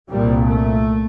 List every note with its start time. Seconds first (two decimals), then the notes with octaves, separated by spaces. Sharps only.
0.10 C2 A#2 G3
0.46 A3